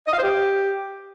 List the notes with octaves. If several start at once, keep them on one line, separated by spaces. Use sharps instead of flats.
D#5
F5
C5
G4